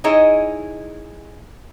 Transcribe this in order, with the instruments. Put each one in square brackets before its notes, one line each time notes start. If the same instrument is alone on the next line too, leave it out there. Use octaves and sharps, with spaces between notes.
[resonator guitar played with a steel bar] D#4 E4 G#4 C#5 D#5